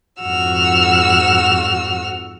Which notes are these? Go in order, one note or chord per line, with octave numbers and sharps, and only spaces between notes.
F2 G#2 F#4 E6 F6